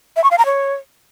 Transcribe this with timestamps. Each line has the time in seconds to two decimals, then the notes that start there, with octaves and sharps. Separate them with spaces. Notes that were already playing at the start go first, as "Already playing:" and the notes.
0.16 E5
0.24 C#6
0.31 F5
0.38 A#5
0.46 C#5